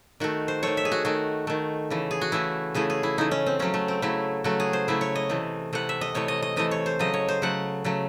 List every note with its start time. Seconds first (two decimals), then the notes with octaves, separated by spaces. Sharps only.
0.20 D#3 A3 F#4
0.48 C5
0.63 D#3 A3 C#5
0.77 E5
0.85 G#4
0.92 F#4
1.05 D#3 A3 F#4
1.47 D#3 A3
1.90 C#3 E3 A3
2.11 G#4
2.21 F#4
2.32 C#3 E3 A3 E4
2.74 C#3 E3 A3 G#4
2.90 G#4
3.03 E4
3.18 C#3 E3 A3 D#4
3.31 C#4
3.46 C4
3.59 C#3 F#3 A3 C#4
3.74 A3
3.88 C4
4.02 C#3 F#3 A3 E4
4.44 C#3 F#3 A3 F#4
4.60 G#4
4.73 C5
4.88 C#3 F#3 A3 E4
5.01 C#5
5.15 D#5
5.29 C3 E3 A3
5.73 C3 E3 A3 F#5
5.89 E5
6.01 D#5
6.15 C3 E3 A3 C#5
6.28 D#5
6.42 D#5
6.56 C3 E3 A3 D#5
6.71 C#5
6.86 C5
6.99 C#3 F#3 A3 D#5
7.14 C#5
7.29 C5
7.42 C#3 F#3 A3 F#5
7.84 C#3 F#3 A3